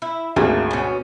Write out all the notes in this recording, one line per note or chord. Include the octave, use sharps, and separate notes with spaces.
E4
G#1 D2 A3 A#3 G#4
B2 C#4